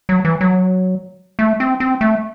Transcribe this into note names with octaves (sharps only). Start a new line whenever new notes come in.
F#3
E3
F#3
A3
C4
C4
A3